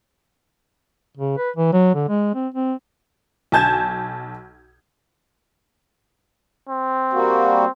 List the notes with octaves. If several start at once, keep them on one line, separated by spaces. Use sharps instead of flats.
C#3
B4
E3
F#3
D3
G#3
C4
C4
B1 G#5 A5 G6 G#6 E7
C4
G3 A#3 F#4